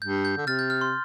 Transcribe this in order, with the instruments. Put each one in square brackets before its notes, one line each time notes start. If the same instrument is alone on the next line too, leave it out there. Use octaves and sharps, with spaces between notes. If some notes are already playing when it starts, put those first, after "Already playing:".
[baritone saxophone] G2 [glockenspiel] G6
[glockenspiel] G6
[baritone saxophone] D3
[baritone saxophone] C3 [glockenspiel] F6 A6
[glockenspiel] G6
F6
C6